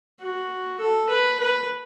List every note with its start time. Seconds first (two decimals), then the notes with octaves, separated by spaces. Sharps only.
0.21 F#4
0.80 A4
1.09 B4
1.40 B4